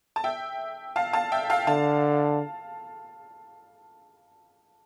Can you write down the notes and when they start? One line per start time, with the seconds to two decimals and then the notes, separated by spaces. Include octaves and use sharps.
0.16 A5
0.24 E5 G5
0.96 F5 A5
1.13 F5 A5
1.32 E5 G5
1.50 F5 A5
1.67 D3 F5 A5